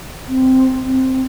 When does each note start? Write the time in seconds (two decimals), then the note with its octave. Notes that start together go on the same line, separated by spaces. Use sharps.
0.28 C4
0.83 C4